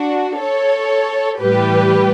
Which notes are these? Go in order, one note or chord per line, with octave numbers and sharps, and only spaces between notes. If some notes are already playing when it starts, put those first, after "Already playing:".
Already playing: D4 F#4
A4 C#5
A2 E3 G3 G4 B4